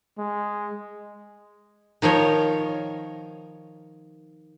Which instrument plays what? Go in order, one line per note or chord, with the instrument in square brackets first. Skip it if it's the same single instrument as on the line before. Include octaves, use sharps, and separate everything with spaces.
[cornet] G#3
[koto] D#3 F3 A#4 C#5